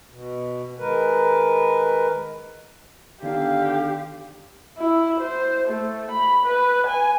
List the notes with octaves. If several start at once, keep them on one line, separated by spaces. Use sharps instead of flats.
B2
D#3 G#3 A#4 B4
D3 D#3 B3 D#4 G4 F5
E4
C5
A3
B5
B4
G#5